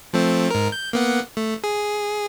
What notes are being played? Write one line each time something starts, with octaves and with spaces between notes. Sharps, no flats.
F3 A3 C4
G#2 A#4
G6
A#3 B3 F#5
A3
G#4